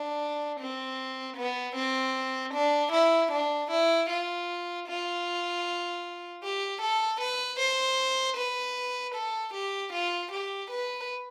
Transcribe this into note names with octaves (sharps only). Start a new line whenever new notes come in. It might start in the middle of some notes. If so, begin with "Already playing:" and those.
Already playing: D4
C4
B3
C4
D4
E4
D4
E4
F4
F4
G4
A4
B4
C5
B4
A4
G4
F4
G4
B4